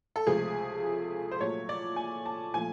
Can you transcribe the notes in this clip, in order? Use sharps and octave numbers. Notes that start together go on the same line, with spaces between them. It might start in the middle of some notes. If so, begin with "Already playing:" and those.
A4
C#2 C3 F3 A3 G#4
C5
A#2 F#3 A3 C#5
D5
G#5
A5
A#2 F3 A3 G#5